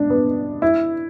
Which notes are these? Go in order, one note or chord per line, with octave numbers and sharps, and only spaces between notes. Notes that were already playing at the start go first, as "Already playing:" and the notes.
Already playing: D4
B3
E4